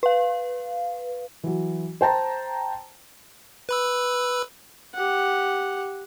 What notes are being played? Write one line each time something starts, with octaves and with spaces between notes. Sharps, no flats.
B4 F5
E3 F#3
C5 G5 A5 A#5
B4 B5 E6
G4 F#5